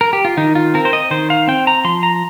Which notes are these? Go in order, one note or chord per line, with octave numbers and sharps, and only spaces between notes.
A#4
G4
F4
D#3 D#4
F4
C4 A#4
C5
D#5
D#3 C5
F5
C4 G5
A#5
F3 C6
A#5